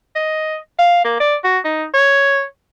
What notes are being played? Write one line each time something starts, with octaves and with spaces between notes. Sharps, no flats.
D#5
F5
A#3
D5
F#4
D#4
C#5